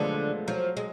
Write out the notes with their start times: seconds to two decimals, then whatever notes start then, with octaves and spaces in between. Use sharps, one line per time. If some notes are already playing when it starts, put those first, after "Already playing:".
Already playing: D3 F3 F#3 G#3 A3 B3
0.47 F3 F#3
0.77 G#3